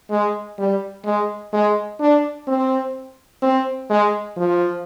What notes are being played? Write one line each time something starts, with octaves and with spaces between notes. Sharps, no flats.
G#3
G3
G#3
G#3
D4
C4
C4
G#3
F3